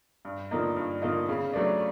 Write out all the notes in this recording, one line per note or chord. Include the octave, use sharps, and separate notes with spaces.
G2
D3 F3 A#3 D#4
G2
D3 F3 A#3 D#4
C#3
F#3 A3 D4